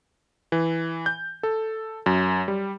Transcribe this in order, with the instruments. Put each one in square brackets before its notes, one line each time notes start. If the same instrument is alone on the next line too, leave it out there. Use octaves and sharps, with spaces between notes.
[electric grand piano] E3
G6
A4
F#2
G3